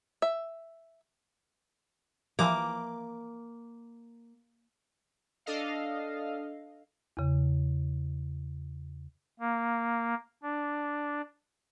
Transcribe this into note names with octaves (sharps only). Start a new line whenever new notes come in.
E5
E3 F3 A#3 D6
D4 A4 D#5 F5
E2 C#3
A#3
D4